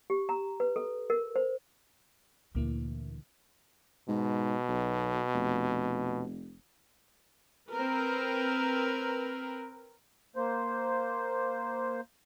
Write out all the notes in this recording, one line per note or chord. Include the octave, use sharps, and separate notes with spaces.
G4
A#5
B4
A4
A#4
C5
D2 A#2 E3 A#3 E4
G#2 B2
B1
F1
C4 A#4 B4
A#3 C5